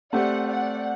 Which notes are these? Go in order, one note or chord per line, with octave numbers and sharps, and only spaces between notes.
A3 C4 G4 D5 F#5
D5 F#5